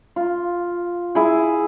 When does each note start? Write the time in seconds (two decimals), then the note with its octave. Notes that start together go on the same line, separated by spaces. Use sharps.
0.16 F4
1.15 E4 G#4